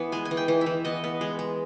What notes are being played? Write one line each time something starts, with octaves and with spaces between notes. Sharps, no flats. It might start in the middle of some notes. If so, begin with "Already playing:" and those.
Already playing: E3 B3
G#3 G#5
G#5
E3
G5
E3
E5
E3
B3 D#5
B3
G#3
G#3